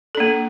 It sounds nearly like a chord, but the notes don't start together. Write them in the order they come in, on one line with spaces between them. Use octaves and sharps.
A4 D4 A#3